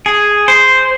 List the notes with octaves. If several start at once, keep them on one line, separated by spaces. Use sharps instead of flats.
G#4
C5